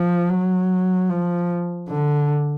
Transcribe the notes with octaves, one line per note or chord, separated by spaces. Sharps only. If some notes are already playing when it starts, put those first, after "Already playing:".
Already playing: F3
F#3
F3
D3